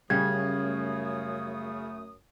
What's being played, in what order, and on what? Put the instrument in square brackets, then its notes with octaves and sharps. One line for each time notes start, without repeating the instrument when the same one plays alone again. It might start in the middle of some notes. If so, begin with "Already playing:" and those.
[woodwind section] F#2 A3 D#6 [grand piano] C#3 [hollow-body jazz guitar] G3 C#4 [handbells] G#6